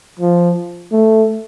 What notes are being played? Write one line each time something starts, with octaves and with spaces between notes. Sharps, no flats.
F3
A3